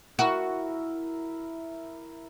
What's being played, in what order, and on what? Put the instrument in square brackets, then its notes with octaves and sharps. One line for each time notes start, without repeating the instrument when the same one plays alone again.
[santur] E4 A#4 [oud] F#4